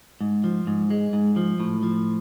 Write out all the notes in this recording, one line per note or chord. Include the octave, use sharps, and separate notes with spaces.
G#2
F3
G#2
G#3
G#2
F3
A2
F3